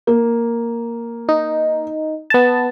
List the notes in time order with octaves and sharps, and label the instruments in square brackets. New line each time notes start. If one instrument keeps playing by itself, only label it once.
[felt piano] A#3
[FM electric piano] D#4
B3 A5